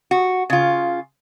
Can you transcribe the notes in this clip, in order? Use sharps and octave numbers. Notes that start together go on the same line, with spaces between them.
F#4
C#3 F4